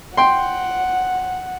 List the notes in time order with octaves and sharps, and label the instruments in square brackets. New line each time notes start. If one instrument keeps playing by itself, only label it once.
[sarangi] F#5 [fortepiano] G5 C6